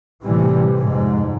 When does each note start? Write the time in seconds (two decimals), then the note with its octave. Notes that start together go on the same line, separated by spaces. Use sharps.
0.23 A2 C3 E3 G3
0.78 F2 G#2